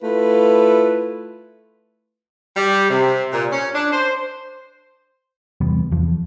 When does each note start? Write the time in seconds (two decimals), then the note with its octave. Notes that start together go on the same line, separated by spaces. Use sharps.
0.02 A3 E4 F4 B4
2.55 G3
2.89 C3
3.32 A#2
3.52 C#4
3.74 D4
3.92 C5
5.61 E2 C3 G3 B3
5.92 E2 F3